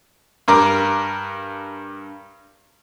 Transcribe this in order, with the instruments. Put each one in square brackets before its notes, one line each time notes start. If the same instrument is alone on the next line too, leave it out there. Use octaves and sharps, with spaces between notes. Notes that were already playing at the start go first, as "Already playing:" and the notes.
[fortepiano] G2 A#4 D6